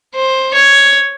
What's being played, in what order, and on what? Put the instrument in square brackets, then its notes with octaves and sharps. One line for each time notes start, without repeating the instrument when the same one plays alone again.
[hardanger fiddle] C5
C#5